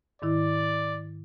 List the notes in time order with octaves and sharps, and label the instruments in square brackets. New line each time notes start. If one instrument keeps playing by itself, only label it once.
[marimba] G#2 D#3 E4 [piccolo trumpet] D5